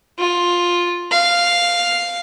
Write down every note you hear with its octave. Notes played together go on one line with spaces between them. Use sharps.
F4
F5